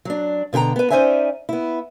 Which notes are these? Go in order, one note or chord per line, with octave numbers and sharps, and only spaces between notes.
F#3 D4
B2 D3 G4 G5 A#5
B3 B4
C#4 D#4 C5 D5 E5 G#5
B3 E4